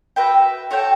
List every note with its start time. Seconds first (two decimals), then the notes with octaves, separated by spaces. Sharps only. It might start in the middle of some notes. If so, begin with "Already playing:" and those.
0.16 F#4 B4 E5 G5
0.71 F#4 A4 C#5 G5